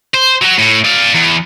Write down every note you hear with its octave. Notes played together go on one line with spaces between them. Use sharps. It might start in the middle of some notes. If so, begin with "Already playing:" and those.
C5
F#3 F#4
A2
D5 F5
E2